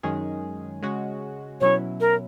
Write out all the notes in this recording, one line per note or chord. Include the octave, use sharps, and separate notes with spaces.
F#2 D#3 G#3 C#4 G#4
C#3 G#3 C#4 F#4
B2 F#3 C#4 E4 C#5
A#4